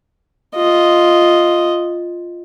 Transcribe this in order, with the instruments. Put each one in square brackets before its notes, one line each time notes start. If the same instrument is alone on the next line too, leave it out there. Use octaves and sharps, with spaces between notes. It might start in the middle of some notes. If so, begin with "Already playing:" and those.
[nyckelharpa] F4 D#5